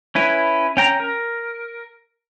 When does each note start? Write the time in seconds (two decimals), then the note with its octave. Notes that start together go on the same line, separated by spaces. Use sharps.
0.15 C#4 E4 B4
0.77 C#4 G5 A#5
1.00 A#4